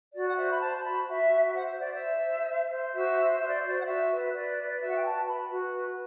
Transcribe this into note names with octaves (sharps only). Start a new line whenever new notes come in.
F#4 D5
F#5
C5 E5
B5
C5 A5
A5
F#4 B5
F#4 E5
F#4
C5 F#5
E5
C5 D5
E5
C5
C5
C5
C5
F#4 E5
C5
C5 E5
D5
F#4 D5
F#5
F#4 E5
B4
B4 D5
B4
D5
F#4 E5
F#5
G5
B4 A5
B4 B5
F#4
B4